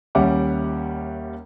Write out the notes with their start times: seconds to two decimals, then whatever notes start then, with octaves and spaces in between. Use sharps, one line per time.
0.15 D#2 G3 C#4 E5 F#5 D6